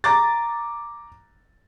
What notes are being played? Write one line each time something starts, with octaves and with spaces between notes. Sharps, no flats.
A#5 D6 A6